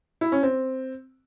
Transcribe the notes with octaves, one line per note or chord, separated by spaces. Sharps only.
E4
C#4
C4